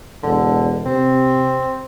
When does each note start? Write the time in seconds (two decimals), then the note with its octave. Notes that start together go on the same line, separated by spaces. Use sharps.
0.23 E1 D3
0.86 C3 C4